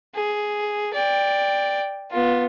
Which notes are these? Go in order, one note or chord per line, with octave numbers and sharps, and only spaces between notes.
G#4
D5 G5
B3 F4